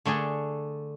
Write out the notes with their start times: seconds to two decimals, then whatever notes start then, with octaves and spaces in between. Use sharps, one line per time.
0.05 D3 A3 D4 G#4